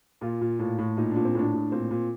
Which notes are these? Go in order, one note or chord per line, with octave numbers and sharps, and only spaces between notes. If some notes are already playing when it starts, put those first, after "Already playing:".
A#2 F4
A#2
A2
A2
A#2 D#4
A#2 D4
C4
A2 D4
A2
A#2 C4
A#2